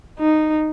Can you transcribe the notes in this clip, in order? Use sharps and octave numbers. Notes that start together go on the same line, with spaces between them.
D#4